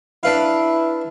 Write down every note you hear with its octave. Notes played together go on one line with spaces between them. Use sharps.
D4 E4 B4 F5